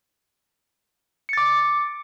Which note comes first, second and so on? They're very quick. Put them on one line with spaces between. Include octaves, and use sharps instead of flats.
C#7 A6 D6